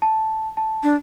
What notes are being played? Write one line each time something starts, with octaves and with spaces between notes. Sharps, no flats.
A5
A5
D4